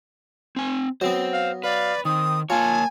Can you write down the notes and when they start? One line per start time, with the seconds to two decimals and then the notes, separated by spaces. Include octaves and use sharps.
0.56 C4 G#5
1.01 F#3 B3 C5 G5
1.34 F5
1.64 B4 D5 F5
2.05 D#3 C4 D#6
2.50 A#3 F4 C#5 G#5 A5